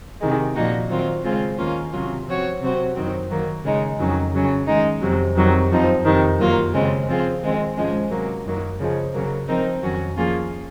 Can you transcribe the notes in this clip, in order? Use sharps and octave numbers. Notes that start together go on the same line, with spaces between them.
C3 D#3 G#3
A#2 F3 A#3 D#4 F#4
D#3 F#3 C4 F4
C#3 G#3 C4 F4 G#4
D#2 D#3 A#3 C#4 F4
C3 F#3 C#4 F4
F3 C4 F#4 C#5
C3 F#3 C4 F#4 C5
F#2 D#3 F#3 C4
D#3 F#3 A#3
C#3 G#3 D#4
F2 D#3 F#3 C#4
C#3 F#3 C#4
D#3 G#3 D#4
F2 C3 F#3
F2 C3 D#3 F#3
F#2 F3 C4 D#4
F2 C3 D#3
F#2 D#3 F#3 A#3 F4
C#3 G#3 C4
F3 C4 F4 G#4
D#3 G#3 C4
G#2 F3 G#3 C#4
C3 F#3 A#3
F#2 D#3 F#3 A#3
C#3 F3 G#3
C#3 F#3 A#3
F3 C4 D#4 A#4
F2 D#3 F#3 C#4 F#4
F3 A#3 C#4 F4 G#4